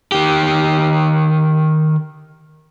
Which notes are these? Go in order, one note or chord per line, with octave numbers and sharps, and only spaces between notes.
D#3 G4